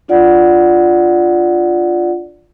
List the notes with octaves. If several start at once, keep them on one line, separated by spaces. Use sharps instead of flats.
D4 F4 D5 F#5